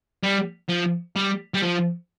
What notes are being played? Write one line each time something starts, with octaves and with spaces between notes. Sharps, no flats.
G3
F3
G3
G3
F3